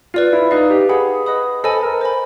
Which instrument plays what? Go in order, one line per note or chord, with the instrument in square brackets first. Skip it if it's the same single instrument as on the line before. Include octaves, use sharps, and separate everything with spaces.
[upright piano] F4 [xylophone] B4 D5 F5
[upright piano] E4
[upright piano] D#4 [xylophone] B4 D5 F5
[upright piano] G4
[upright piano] G#4 [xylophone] B4 D#5 F#5 B5 D#6
[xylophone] B4 D#5 F#5 B5 D#6
[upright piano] A4 [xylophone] C5 D#5 G#5 B5
[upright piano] A#4
[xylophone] C5 D#5 G#5 B5